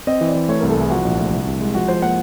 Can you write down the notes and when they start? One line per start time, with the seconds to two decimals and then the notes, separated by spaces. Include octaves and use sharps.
0.07 C4 D#5
0.21 E3
0.28 D5
0.35 E3
0.48 A3 C#5
0.60 C2 A#4
0.70 A4
0.77 C2 G#4
0.91 F3 F#4
1.05 A#1
1.19 A3
1.33 C2
1.47 C2
1.60 G#3
1.75 F3 F#4
1.88 F3 C5
2.02 A#3 F#5